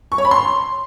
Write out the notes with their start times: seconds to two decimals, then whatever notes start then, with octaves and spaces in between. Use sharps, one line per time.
0.12 C#6
0.18 C#5
0.25 B5
0.31 C6